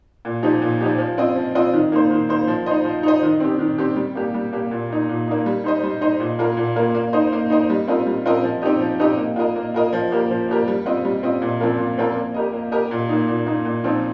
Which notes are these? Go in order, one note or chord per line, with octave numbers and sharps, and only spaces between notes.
A#2
F3 D#4 G4
A#2
F3 D#4 G4
F3
C4 F4 D#5
F3
C4 F4 D#5
D#3
A#3 D#4 C5
D#3
A#3 D#4 C5
F3
D#4 C5 D#5
F3
D#4 C5 D#5
D#3
C4 G4
D#3
C4 G4
G3
A#3 G4
G3
A#3 G4
A#2
A#3 D#4
A#2
A#3 D#4
G3
D#4 C5 D#5
G3
D#4 C5 D#5
A#2
A#3 F4 A#4
A#2
A#3 F4 A#4
A#3
D#4 C5 D#5
A#3
D#4 C5 D#5
G3
C4 F4 A#4 D#5
G3
C4 F4 A#4 D#5
F3
C4 D#4 G4 D#5
F3
C4 D#4 G4 D#5
A#3
F4 A#4 D#5
A#3
F4 A#4 D#5
F3
A#3 G4 A#4
F3
A#3 G4 A#4
G3
C4 F4 D#5
G3
C4 F4 D#5
A#2
F3 C4 F4 A#4
A#2
F3 C4 F4 A#4
A#3
G4 A#4 D#5
A#3
G4 A#4 D#5
A#2
A#3 D#4
A#2
A#3 D#4
A#2
F3 C4 D#4